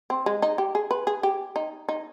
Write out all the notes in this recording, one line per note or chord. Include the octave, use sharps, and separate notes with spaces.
C4
G#3
D#4
G4
G#4
B4
G#4
G4
D#4
D#4